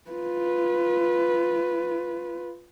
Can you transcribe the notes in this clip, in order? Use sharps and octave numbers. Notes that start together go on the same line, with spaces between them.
F4 B4